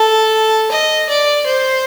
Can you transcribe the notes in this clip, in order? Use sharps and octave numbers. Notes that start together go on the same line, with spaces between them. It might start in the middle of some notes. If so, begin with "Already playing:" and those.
Already playing: A4
D#5
D5
C5